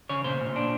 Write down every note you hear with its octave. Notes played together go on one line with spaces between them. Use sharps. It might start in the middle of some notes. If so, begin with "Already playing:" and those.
C#3 C#5
A#2 C5
A#2
D4